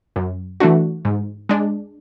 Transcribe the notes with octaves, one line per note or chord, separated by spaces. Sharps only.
F#2
E3 A3 D4 F#4
G#2
G#3 D4